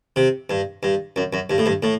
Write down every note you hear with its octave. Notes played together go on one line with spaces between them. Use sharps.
C3
G2
G2
F#2
F#2
G2
A2
G2
A2